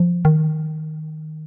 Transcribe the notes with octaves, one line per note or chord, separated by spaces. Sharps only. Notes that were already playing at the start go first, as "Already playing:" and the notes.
Already playing: F3
D#3